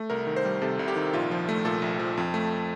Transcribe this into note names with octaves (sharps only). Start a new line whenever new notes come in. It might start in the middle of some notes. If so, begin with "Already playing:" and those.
Already playing: A3
C2 A#4
D#3
C5
G3
C3 A4
C2
G4
D#3
A#1 F4
F3
A3
A#2 A4
A#1
F3
F2
A3